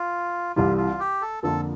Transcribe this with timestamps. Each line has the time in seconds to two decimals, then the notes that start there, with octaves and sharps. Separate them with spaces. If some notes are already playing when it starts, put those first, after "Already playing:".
Already playing: F4
0.56 C2 C3 E3 G3 F4
0.77 F4
1.00 G4
1.21 A4
1.43 F2 D3 F3 A#3 F4 A4